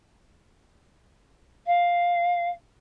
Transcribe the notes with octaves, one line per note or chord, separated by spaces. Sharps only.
F5